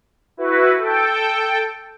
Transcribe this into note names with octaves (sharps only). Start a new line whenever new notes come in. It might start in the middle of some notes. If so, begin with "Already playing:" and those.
E4 F#4 B4
A4 G5